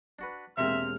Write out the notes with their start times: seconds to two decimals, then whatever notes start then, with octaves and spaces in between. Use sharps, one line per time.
0.19 D4 F#4 B4
0.57 E1 C3 G#3 A#3 C4 G4 E5 F6